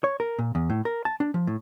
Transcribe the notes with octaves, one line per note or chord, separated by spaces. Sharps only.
C#5
A#4
A#2
E2
A2
A#4
A5
D4
F3
A2